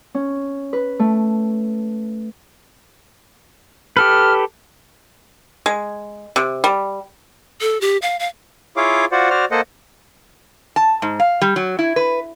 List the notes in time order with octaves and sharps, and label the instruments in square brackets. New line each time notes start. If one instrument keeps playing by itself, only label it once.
[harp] C#4
B4
A3
[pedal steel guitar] G4 A4 B4 [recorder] F6
[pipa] G#3
C3
G3
[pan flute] A4
G4
F5
F5
[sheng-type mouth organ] E4 F4 G#4 C#5 F5 D6
F4 F#4 C5 D5 F#5
F#4 C5 D5 F6
A#3 A4 C5 D#5 F#5
[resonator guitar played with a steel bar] A5
G#2
F5
G3
F#3
E4
B4